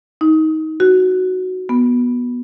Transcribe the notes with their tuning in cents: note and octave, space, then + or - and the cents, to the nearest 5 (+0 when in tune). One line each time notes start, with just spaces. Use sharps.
D#4 +20
F#4 +0
B3 -15